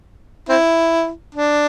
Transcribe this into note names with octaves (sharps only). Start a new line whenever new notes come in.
C4 E4
D4